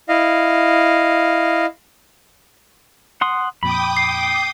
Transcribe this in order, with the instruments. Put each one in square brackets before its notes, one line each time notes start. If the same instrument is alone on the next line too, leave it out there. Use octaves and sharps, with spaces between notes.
[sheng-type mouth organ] E4 D#5 F5
[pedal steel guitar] F#5 C6 D#6
[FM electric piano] F2 A#2 [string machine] G5 D6 D#6 [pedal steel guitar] B5
[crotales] C7